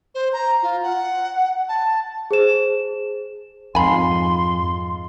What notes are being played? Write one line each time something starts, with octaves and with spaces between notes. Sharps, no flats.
C5
A#5
F4
F#5
A5
G#4 C5 E7
F2 G#2 F4 G#5 B5 C6